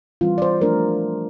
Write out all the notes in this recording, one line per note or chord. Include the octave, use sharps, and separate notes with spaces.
E3 G3 C4 F4
D5
C5
F3 A3 D4 A#4